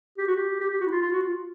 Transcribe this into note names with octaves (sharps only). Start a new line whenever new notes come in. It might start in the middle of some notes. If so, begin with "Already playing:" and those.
G4
F#4
G4
G4
G4
F#4
E4
F4
F4
F#4
F4